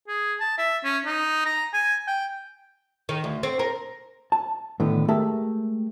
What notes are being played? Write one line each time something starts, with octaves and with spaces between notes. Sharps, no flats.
G#4
A5
E5
C#4
D#4
A#5
G#5
G5
D#3
D2
C4
A#4
A5
A2 D3 D#3 B3
G#3 A3 G4 A#4 E5 A5